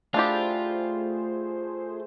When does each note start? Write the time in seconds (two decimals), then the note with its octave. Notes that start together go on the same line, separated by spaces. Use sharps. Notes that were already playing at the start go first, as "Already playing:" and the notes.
0.14 A3 D4 E4 F4 G4 G#4 C5